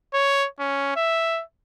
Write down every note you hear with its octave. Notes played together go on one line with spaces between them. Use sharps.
C#5
C#4
E5